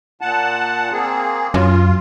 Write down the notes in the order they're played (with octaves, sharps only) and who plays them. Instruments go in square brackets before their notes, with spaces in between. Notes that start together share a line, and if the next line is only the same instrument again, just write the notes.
[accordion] A#2 F#5 A5
A#3 C4 G#4
[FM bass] F#2 [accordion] F4